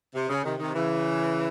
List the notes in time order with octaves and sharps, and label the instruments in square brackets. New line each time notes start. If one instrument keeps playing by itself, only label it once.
[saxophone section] C3
C#3
C3 D#3
C3 D#3
C#3 E3